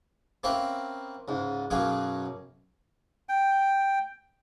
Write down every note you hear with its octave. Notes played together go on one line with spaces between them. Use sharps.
A#3 C4 C#4 A#4 B4 E5
C#2 G#2
B1 F#2 B2 A#3 C#4 G#4
G5